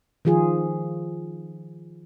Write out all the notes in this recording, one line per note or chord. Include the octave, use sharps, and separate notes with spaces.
D#3 F3 F4 G#4